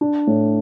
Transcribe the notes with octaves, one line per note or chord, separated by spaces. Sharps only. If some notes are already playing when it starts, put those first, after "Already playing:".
D4
A2